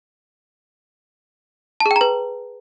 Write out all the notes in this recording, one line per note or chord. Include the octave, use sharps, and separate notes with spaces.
A5
G#4
G5
A#5
B4